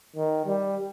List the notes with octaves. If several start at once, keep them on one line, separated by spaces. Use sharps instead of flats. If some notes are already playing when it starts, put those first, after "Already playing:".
D#3
G3